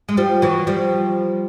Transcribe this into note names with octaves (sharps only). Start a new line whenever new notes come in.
G#3
F3 G3
E3 F#3
F3 G3